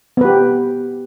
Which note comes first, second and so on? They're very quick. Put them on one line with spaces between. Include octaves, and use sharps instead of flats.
B3 B4 G4